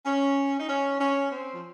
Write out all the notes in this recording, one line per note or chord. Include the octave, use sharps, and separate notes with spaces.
C#4
D#4
C#4
C#4
C4
F3